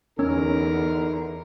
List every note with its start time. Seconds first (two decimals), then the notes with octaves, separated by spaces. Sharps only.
0.19 E2 D3 C#4 D#4 A#4